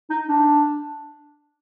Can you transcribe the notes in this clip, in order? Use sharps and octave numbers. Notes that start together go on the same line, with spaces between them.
D#4
D4